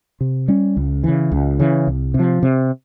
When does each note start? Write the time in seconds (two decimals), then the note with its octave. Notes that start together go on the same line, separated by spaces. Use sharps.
0.21 C3
0.48 G3 C#4
0.77 C#2
1.03 C#3 E3
1.32 C#2
1.59 C#3 E3
1.87 C2
2.14 C3
2.19 F3
2.43 C3